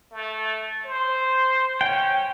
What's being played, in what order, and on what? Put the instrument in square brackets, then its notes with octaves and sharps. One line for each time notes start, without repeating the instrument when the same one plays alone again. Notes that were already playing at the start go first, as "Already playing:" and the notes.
[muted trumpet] A3
C5
[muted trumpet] C#4 [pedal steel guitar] G5